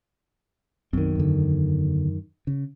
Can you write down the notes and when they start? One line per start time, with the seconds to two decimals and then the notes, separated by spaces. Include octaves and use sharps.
0.93 B1 F#2 D#3 C4
1.15 E2 D3
2.47 C#3